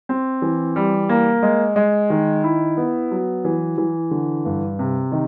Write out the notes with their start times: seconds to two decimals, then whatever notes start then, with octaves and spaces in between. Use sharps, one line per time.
0.09 C4
0.42 E3
0.76 G3
1.09 A#3
1.43 G#3
1.76 G#3
2.10 D#3
2.44 E4
2.77 B3
3.11 F#3
3.45 E3
3.78 E3
4.11 D3
4.45 G2
4.79 C3
5.12 D#3